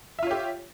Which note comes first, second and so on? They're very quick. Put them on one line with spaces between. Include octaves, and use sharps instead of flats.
E5 F4 C#5 G4